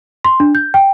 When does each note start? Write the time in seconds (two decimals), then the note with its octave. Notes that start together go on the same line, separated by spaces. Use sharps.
0.25 C6
0.40 D4
0.55 G6
0.74 G5